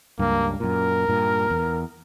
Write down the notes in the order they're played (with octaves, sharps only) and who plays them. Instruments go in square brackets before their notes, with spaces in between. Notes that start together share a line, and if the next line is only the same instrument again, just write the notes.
[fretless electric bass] C#2 G2 [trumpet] A#3
[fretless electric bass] F#2 A#2 [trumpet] A#4
[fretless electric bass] G2 A#2
E2